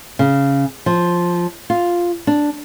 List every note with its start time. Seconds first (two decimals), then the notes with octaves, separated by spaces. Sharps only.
0.19 C#3
0.86 F3
1.70 F4
2.27 D4